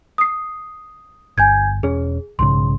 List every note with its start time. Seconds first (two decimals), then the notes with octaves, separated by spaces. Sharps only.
0.18 D#6 C7
1.38 G1 G#5 G6 G#6
1.83 E1 C#4 G#4
2.39 B1 G#2 C#3 C6